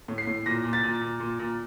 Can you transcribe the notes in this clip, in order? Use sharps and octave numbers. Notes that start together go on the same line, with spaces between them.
A2
C7
A2
A#2 A#6
A#2
A6
A#2
A#2
A#2
A#2